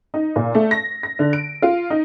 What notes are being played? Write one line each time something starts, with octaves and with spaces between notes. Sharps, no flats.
D#4
A#2
A3
A#6
A#6
D3
D7
F4
D#4